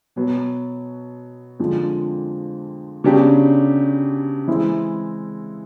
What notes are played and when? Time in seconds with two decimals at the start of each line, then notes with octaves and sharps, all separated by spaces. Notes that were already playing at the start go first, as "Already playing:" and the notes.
0.16 B2 F#3 B3
1.59 F2 D3 F3 G#3
3.04 C#3 F#3 B3 D4 G4
4.47 E3 G#3 C4 E4